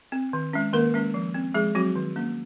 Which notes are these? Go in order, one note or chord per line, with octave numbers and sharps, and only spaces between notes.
C4
D#3
G#3 C#4
D#3 A#3 A#4
G#3 C#4
F3
C4
F3 G#3 G#4
F#3 C4 F#4
D#3
A#3 C#4